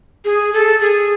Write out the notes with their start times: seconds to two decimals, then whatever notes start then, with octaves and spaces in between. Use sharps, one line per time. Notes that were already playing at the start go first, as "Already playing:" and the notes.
0.25 G#4
0.54 A4
0.81 G#4